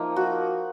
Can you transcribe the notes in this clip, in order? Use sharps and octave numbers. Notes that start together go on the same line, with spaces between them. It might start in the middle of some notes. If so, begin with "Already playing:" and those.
Already playing: F3 A#3 D#4
F#4